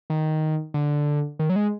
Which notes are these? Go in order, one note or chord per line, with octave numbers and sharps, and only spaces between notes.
D#3
D3
D#3
F#3
G#3